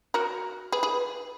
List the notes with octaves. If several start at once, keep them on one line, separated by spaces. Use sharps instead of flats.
F#4 A#4
G#4 B4
G#4 B4